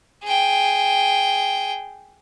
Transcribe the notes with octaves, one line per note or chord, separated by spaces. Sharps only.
G#4 G5